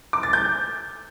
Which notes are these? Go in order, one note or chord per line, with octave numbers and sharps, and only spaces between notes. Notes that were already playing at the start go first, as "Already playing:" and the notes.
D6
A6
G6